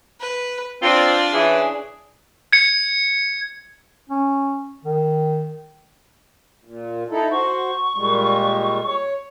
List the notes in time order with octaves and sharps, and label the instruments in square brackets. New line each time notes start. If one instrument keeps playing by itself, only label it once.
[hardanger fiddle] B4
[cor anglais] C4 [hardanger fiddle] D4 D5 [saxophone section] F4
[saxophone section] C#3 E3 [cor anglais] G#4
[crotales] G#6 C#7
[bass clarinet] C#4
D#3
[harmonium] A#2
D#4 E4 A4
[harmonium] F#4 C5 [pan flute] C#6
[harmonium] A#2 G3 G#3
C#5